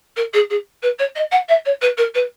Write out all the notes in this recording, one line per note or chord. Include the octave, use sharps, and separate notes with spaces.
A#4
G#4
G#4
B4
C#5
D#5
F#5
E5
C#5
B4
A#4
B4